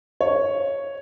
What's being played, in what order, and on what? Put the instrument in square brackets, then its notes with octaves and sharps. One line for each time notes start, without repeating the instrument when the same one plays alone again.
[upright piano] C#5